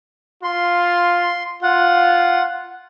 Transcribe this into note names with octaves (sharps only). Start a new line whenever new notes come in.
F4 C6
F4 F#5